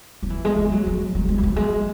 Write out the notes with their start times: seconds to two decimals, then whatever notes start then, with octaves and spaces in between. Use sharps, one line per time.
0.23 F#3
0.30 E3
0.45 G#3
0.58 G#3
0.72 F#3
0.86 F#3
1.15 F#3
1.29 G#3
1.38 E3
1.43 F#3
1.56 G#3